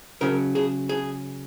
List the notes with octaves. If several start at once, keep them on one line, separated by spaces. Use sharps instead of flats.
C#3 F#3 A#4
G#4
G#4